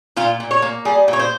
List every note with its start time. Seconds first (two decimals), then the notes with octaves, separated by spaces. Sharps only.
0.16 A#2 F4
0.40 A#2
0.51 C#5
0.62 A#3
0.85 G3 G#4
1.08 A#2
1.13 C#5
1.19 C5